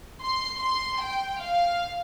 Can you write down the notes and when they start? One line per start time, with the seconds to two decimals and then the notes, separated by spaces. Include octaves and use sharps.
0.22 C6
0.61 C6
1.02 G5
1.42 F5